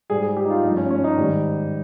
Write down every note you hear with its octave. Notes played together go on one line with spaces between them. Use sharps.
G#2 G3 G#4
G#4
G4
D#4
F4
G2 F3 D#4
C#4
C#4
D#4
G#2 D#3 G3